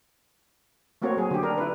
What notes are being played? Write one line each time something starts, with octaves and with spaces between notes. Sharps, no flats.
A3 A#3 C4 F#4 C#5
F#3 G#4
D3 G4
D4 A#4
E4 B4